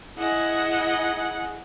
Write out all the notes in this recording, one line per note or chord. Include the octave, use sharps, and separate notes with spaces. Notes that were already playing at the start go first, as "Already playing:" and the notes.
E4 G#4 D#5 F#5